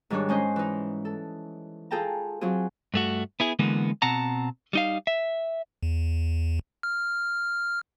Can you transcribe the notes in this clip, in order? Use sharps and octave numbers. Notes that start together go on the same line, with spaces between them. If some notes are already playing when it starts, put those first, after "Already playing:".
G#2 D#3 G3 D4 C#5 F#6
G#3 C#4 C5 D#5
E3 D#4
A4
F4 G#4 A4 G5 A5 A#5
F#3 C4 F4 G#4
G2 A3 F#4
B3 E4 G#4
D3 E3 G#3 A#3 B3
B2 C4 F#5 A5 A#5
G3 D#4 F5
E5
E2
F6